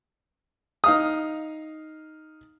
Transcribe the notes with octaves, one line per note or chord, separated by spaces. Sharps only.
D#4 F5 D#6